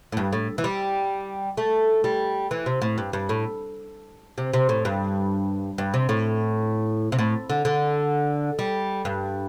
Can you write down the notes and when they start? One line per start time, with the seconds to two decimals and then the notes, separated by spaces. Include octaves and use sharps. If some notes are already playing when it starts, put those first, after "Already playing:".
0.12 A2
0.17 G2
0.33 A2
0.58 E3
0.64 G3
1.57 A3
2.04 G3
2.51 E3
2.66 C3
2.82 A2
2.98 G2
3.13 G2
3.29 A2
4.38 C3
4.54 C3
4.69 A2
4.85 G2
5.78 G2
5.94 C3
6.09 A2
7.12 C3
7.19 A2
7.50 D3
7.65 D3
8.59 G3
9.05 G2